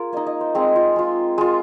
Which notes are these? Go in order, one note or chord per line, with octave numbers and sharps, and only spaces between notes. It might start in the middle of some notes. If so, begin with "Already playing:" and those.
Already playing: F4 G#4 A#4
A#3 D#4 D#5
D#5
C5
G#3 C4 D#4 G#4
F4
G#3 F4
G#3 F4